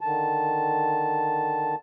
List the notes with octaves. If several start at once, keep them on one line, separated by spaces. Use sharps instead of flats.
D3 D#3 A5